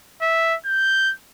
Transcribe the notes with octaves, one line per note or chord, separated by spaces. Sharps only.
E5
G6